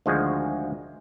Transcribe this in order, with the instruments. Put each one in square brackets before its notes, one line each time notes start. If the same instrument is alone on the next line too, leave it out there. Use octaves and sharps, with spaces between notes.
[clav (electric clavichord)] D2 D#3 F3 G#3 F#4 G#4